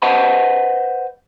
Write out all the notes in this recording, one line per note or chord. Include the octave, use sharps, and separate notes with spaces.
B4 C5 D#5 F#5 A5 B5